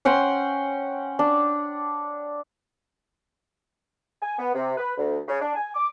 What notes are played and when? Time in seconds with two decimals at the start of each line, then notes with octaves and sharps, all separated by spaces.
0.05 C#4 F#5 G5 C6
1.19 D4
4.21 G#5
4.38 B3
4.54 C3
4.77 B4
4.96 D2
5.27 C#3
5.40 D4
5.54 G#5
5.74 D6